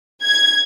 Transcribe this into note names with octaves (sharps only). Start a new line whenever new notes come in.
G#6